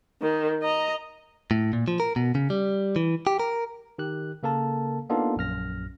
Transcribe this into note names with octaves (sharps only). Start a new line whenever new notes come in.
D#3
D#5 A#5
A2
A#2
F3
A#4
B2
C#3
G3
E3
G4
A#4
D#3 G4 F#6
C#3 A#3 A4 A#4 A5
A#3 B3 D4 D#4 F4 A4
A#1 F#2 F6 A#6